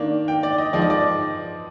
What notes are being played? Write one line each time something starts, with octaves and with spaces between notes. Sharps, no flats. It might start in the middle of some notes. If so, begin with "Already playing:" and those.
Already playing: D#3 A#3 D4
G5
D5
D#5
F3 G#3 D#4 D5
D#5
D5